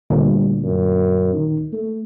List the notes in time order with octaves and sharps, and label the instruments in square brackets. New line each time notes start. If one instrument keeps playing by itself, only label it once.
[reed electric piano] D2 A#2 [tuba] G3
[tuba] F#2
D#3
A3